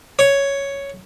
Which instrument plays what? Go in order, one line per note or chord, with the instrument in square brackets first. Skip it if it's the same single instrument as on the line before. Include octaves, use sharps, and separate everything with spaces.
[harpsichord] C#5